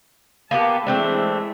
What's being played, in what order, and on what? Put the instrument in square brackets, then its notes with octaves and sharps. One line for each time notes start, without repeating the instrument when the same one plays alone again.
[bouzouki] A#3 B3 G4 [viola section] B4 A5
[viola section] E3 G#3 E5 [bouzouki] A3 C4 D4